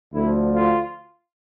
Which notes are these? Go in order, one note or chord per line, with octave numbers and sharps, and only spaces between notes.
D2 D3 F3 E4
F4